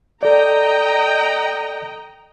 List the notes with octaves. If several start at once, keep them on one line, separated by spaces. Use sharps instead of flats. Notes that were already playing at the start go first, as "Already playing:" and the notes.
A4 D5 D#5 G5 A#5